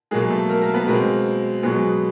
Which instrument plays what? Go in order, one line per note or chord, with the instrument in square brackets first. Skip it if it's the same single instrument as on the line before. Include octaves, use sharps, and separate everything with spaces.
[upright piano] B2 F#3 G#3 A#3 G#4
A3 A4
A#3 A#4
A#3 A#4
B3 B4
B2 G#3 A#3 C4 A#4
B2 F#3 G#3 B3 G#4